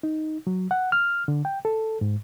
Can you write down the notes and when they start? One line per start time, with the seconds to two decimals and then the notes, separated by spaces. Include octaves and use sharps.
0.03 D#4
0.47 F#3
0.71 F#5
0.92 F6
1.28 D3
1.45 G5
1.65 A4
2.01 G#2